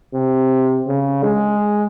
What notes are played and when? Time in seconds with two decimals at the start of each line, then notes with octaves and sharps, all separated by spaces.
0.14 C3
0.87 C#3
1.23 G#3